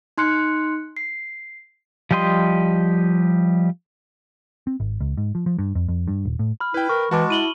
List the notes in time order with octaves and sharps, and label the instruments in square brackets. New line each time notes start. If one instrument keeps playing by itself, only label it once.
[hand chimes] D#4 C6 F#6 C#7
C7
[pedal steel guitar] F3 G3 G4 D#5 C6
[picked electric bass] C4
G#1
C#2
G#2
F3
F3
G2
F2
F2
G2
D#1
A2
[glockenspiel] B5 F6
[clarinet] E4 [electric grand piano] B4 G5
[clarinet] A#4 [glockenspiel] C#6
[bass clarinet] E3 [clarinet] G#3 [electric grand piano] F#4 A5 D6
[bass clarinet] E4 [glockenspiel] D#7 F#7 G7